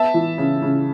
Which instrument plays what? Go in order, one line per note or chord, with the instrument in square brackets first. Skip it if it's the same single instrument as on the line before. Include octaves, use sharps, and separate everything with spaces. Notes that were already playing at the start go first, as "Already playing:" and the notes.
Already playing: [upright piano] B3 [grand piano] E5 A5
[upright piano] E3
C#3
C#3